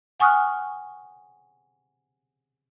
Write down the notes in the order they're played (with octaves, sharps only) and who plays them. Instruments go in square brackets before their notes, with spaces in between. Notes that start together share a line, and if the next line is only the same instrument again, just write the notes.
[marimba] F#5 G#5 C#6 D#6 F6 F#6